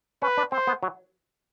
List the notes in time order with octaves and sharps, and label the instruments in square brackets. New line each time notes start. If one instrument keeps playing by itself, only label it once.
[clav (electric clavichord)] C#4 [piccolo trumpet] B4
[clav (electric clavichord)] D4
[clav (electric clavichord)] C4 [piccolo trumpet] C5
[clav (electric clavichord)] B3
F#3